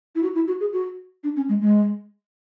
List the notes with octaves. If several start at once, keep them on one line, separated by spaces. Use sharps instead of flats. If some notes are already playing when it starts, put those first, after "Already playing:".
E4
F#4
E4
F#4
G#4
F#4
D4
C#4
G#3
G#3